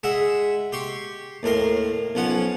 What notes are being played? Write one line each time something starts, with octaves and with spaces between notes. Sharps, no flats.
G#3 E5 F#5
G4 C6 C#6
D#2 A2 A#4 C6
B1 F3 C#4 F#5